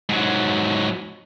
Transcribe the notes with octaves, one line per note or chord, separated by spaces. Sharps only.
G#2 F#3